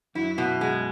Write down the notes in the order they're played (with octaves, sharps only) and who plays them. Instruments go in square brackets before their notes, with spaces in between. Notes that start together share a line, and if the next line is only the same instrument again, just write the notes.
[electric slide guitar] F#2 F#3 [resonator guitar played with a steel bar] E4
[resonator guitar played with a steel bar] B2
G#3